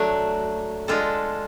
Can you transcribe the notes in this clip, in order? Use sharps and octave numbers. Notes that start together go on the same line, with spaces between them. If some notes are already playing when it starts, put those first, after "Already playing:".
Already playing: F#3 A3 D4
G#3 D4 F4 A4